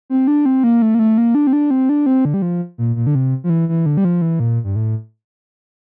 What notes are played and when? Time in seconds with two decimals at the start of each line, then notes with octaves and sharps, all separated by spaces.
0.10 C4
0.27 D4
0.46 C4
0.64 A#3
0.82 A3
0.95 A#3
0.99 A3
1.18 A#3
1.35 D4
1.47 C4
1.53 D4
1.71 C4
1.89 D4
2.06 C4
2.25 D3
2.34 G3
2.42 F3
2.78 A#2
2.96 A#2
3.07 D3
3.15 C3
3.44 F3
3.50 E3
3.69 E3
3.86 D3
3.97 G3
4.05 F3
4.22 E3
4.40 A#2
4.64 G2
4.76 A2